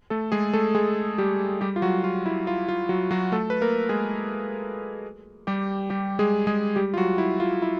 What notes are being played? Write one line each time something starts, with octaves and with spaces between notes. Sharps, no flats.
A3 A4
G#3 G#4
A3 A4
G#3 G#4
G3 G4
G3 G4
F4
F#3 F#4
F4
E4
F4
F4
F#3 F#4
F#3 F#4
A3 A4
B4
A#3 A#4
G#3 G#4
G3 G4
G3 G4
G#3 G#4
G#3 G#4
G3 G4
F4
F#3 F#4
E4
F4
E4